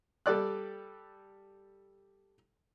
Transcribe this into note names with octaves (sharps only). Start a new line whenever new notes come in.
G3 A4 D5 F#6